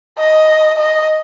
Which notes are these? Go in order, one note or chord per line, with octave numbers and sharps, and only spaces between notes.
D#5
D#5